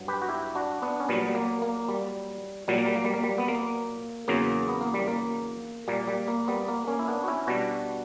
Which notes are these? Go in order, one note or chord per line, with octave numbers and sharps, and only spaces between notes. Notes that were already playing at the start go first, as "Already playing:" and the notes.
Already playing: G2 F#3
G4 B4
F#4
E4 G4
D4 F#4
B3 D4
C#4
A#2 F#3 G3 B3
G3
A#3
A#3
G3
A#2 F#3 G3
A#3
G3
A#3
G3
A#3
G3
B3
A#3
E2 C#3 F#3 A#3
B3
A#3
G3
A#3
A#2 G3 A#3
G3
A#3
G3 B3
A#3
A#3 C#4
E4
B3 D4
F#4
C#4 E4
B2 G3 D4 F#4